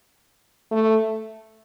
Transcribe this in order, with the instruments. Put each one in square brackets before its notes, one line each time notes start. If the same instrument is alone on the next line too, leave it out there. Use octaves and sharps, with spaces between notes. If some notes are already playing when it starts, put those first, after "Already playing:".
[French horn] A3